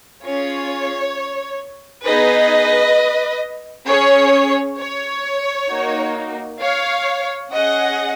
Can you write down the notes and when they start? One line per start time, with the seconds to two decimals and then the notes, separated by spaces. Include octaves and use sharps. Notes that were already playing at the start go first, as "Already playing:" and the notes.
0.24 C#4 F4 G#4 C#5
2.06 B3 D#4 G#4 B4 D#5
3.89 C#4 G#4 C#5
4.79 C#5
5.71 A#3 D#4 F#4
6.62 C#5 F5
7.53 C#4 G#4 D#5 F#5